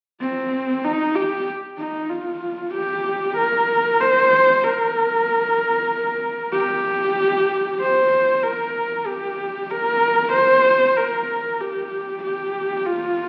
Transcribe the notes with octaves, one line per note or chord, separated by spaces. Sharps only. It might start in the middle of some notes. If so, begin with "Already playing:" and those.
C4
D#4
G4
D#4
F4
G4
A#4
C5
A#4
G4
C5
A#4
G4
A#4
C5
A#4
G4
G4
F4